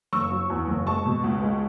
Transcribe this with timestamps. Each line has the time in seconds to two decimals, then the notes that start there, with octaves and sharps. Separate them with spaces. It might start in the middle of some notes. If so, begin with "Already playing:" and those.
0.13 F#1 C#6 E6
0.31 F#3
0.50 E2
0.68 F#1
0.86 G#3 A5 C#6
1.06 B2
1.24 C#2
1.42 G#3